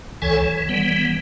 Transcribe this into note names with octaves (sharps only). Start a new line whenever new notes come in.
C#2 E3 A4 C#5 G#5
E3
E3 G3 B3